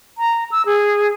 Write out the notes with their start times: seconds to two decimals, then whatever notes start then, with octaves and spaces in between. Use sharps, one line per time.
0.18 A#5
0.51 E6
0.66 G#4